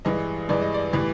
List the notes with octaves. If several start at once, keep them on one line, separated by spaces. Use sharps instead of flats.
G2 E3 G#3 D#5
G2 E3 G#3 D5
D#5
D5
A2 E3 G3